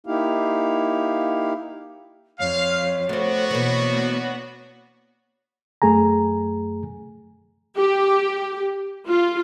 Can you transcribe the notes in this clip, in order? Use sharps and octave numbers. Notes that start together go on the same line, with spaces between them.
A#3 D#4 E4 G4 F5
F2 C#5 F5
A3 B3 C4 D4 F#4
B2 E3 A#3 C#5
F#2 A3 G#4 G#5 A#5
G4
F4